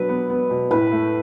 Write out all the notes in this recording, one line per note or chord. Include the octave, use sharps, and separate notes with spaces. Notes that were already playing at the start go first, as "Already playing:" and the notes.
Already playing: B2 F#3 D4 B4
B3
B3
B2
A2 B4
A3